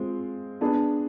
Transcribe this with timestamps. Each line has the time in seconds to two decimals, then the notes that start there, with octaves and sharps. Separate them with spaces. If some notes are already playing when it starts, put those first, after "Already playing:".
Already playing: G#3 C4 F4
0.61 B3 D4 G#4